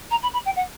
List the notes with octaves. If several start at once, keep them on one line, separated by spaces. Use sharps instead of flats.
A#5
B5
B5
G5
F#5